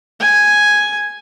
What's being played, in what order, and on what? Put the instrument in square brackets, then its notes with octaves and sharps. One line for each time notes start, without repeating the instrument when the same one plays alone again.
[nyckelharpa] G#5